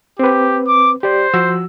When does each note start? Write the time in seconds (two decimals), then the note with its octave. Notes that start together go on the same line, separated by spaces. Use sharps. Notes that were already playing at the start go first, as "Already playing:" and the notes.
0.19 C4 G4 B4
0.67 D6
1.03 G4 C5 D5
1.34 F3 F#4 E6